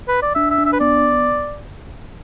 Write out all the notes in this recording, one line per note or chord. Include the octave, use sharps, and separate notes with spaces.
B4
D5
D4 E5
E5
D4
E5
B4
B3 D5